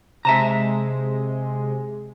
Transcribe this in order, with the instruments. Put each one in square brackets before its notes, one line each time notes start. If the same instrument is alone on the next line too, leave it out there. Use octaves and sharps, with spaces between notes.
[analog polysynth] C3 G#3 [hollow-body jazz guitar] E5 A5 A#5